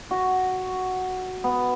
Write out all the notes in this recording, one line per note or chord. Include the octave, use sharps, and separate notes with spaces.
F#4
B3